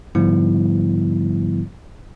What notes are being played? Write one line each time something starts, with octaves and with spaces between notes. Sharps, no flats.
G#2 D3 F3 G3 B3 E4